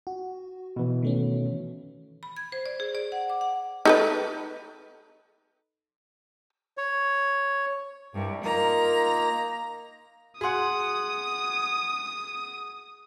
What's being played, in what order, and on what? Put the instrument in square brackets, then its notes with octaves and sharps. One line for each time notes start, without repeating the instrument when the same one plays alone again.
[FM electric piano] F#4
[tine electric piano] B2 E3
[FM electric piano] D#3 A3 C#4
[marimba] B5
G#6
C5
D5
G#4
D5
F#5
D6
F#5
[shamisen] D#4 A4 B4
[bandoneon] C#5
[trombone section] C2 [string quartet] G2
[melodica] A#3 D#4 [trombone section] F4 A#4 [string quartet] A#5
[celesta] F#4 C6 [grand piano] G#4 F#5 [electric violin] D#6